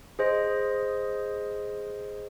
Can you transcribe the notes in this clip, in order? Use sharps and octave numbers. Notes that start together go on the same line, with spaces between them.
G#4 C5 D#5